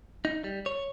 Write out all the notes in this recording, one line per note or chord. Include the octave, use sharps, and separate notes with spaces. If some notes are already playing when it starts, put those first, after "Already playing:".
D#4
G3
C#5